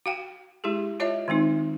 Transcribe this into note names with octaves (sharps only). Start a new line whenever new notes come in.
F#4 F5 G5
G#3 E4 G4 G#4
F4 C#5 D#5 E5 A5
D#3 G#3 C4 D#4